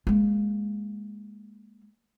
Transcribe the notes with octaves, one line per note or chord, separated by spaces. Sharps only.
G#3 A#3